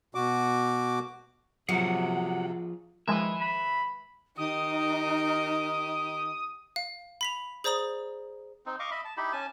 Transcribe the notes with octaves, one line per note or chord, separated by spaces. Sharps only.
B2 F#4 D6
C3 F3 F#3 F4 F#4 G#4 F#5
D#3 F3 G#3 B4 E5
B5
D#3 D#4 G4 D#6
F5
B5 B6 F7
G#4 C5 D5 A#5 D#6 F#7
C4 D#4
D#5 F5 C#6 D6
D#5 E5 B5
A5
D#4 E4 G4 B5
C#4 G#5 A5